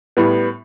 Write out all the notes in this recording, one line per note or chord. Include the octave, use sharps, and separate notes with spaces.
A2 G3 B3